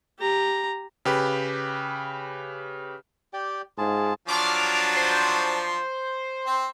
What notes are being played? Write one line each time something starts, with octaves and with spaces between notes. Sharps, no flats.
G4 A#5
C#3 G4 B4
G4 D5 G5
G#2 F4 G#4 A5
F3 F#3 D4 D6 F6
C5
C4